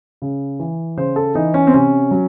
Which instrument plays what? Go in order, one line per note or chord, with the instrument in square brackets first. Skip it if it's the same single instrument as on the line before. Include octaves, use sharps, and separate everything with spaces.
[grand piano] C#3
E3
C#3 C5
A4
E3 D#4
C#4
C4
C3 C#4
F#3